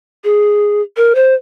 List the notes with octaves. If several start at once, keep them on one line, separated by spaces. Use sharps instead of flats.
G#4
A#4
C5